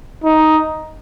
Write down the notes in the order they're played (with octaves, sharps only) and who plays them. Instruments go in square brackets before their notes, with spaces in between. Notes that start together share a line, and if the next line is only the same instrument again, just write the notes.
[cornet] D#4